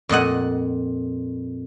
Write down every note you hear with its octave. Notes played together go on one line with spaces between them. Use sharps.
F2 A#2 D#5 F#5